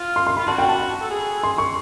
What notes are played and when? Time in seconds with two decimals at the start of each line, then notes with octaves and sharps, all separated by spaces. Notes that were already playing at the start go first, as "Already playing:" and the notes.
Already playing: F4
0.16 C6
0.27 C6
0.37 F4 B5
0.47 D4 F#4 A5
0.58 G5
0.69 A5
0.80 B5
1.03 A4
1.11 G#4
1.43 C6
1.58 C#6